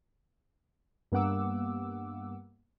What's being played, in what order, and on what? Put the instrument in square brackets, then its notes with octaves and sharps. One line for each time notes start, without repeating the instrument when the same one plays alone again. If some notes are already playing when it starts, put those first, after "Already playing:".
[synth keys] G2 A#3 B3 F#5 D6 E6